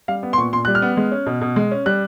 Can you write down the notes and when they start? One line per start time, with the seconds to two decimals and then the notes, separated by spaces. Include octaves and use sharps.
0.08 G3 F5
0.23 B3
0.33 C6
0.38 A#2 C#6
0.53 A#2 C6
0.65 G3 F#6
0.75 F6
0.82 B3
0.97 G#3
1.12 C#4
1.27 B2
1.41 B2
1.56 G#3
1.71 C#4
1.86 G3 F#6